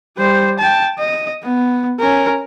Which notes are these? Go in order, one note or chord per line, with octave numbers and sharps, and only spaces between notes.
G3 C5
G5 A5
D#5
B3
C#4 A#4